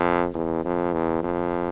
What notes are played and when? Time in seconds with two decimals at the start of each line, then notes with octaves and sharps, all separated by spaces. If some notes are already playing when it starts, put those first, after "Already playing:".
Already playing: F2
0.34 E2
0.64 F2
0.93 E2
1.23 F2